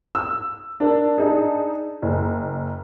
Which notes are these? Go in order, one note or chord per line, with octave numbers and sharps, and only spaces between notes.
E6
D4 A#4
D4 D#4 G#4
F#1